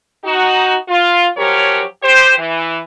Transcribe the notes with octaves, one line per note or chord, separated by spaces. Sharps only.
D#4 F#4
F4
F3 F#3 C#4 G4 A#4 C#5
G4 C5
E3